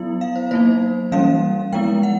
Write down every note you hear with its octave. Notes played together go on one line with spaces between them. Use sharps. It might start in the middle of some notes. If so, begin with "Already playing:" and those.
Already playing: F#3 B3 E4
F5
C5
F#3 A#3 D#4 C5
E3 G3 A#3 C#4 F5
F3 G#3 B3 E4 G5
F#5